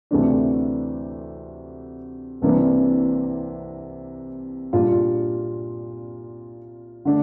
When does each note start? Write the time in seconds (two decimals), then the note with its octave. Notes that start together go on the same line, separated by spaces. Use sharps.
0.11 D2 C3 E3 A3 D4
2.42 C2 C3 E3 A#3 D4
4.73 A#2 G3 D4 F4
7.05 D3 A3 D4